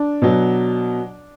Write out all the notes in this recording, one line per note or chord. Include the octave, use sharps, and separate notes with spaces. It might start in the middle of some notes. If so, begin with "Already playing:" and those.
Already playing: D4
B2 F#3